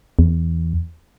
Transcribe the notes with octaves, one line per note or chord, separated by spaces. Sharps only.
E2